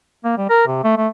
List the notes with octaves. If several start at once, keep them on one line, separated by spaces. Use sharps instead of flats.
A#3
G3
A#4
C3
A3
A3